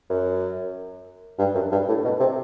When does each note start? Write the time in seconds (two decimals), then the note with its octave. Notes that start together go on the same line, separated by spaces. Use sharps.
0.09 F#2
1.39 G2
1.55 F#2
1.72 G2
1.88 A2
2.04 B2
2.20 C3